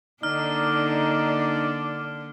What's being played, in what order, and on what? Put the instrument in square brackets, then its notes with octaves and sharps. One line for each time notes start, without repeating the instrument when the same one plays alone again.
[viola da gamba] D3 A#3 D4 [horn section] D#4 [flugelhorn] D5 [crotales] F6